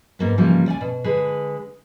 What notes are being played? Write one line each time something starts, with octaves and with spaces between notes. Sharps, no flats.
G#2 A#3 B3
G#2 C#3 E3 F3 G3 A#3
D2 D5 F#5 G#5
B2
D3 G#3 G#4 B4